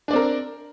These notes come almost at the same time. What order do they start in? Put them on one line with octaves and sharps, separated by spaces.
D4 D5 C4 A#4